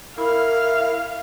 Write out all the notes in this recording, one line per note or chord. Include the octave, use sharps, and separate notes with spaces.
E4 A#4 F5